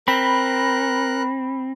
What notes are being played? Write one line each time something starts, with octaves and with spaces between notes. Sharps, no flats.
C4 A#4 B5 F#6